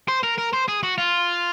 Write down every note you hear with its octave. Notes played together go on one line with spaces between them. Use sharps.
C5
A#4
A#4
C5
G#4
F#4
F4